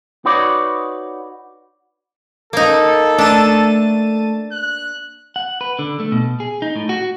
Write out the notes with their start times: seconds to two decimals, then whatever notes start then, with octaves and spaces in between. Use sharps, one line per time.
0.25 D#4 F#4 B4 C#5 D5
2.53 A#3 D#4 A4
3.18 A3 D4 A5 D#7
4.52 F#6
5.36 F#5
5.61 B4
5.79 D3
6.00 A3
6.12 B2
6.40 G#4
6.62 D#4
6.76 A2
6.89 F#4